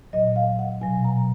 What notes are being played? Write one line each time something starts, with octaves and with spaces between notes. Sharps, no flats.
A#2 F#3 D#5
F5
F#5
B2 F#3 G#5
A#5